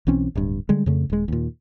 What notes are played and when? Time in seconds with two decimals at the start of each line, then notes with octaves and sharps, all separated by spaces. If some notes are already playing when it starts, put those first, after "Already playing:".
0.07 B1 E3 C4 C#4
0.35 D1 G2
0.69 D3 G3 G#3
0.86 F2 C#3 A3
1.10 D#1 G#3
1.28 D#2 A#2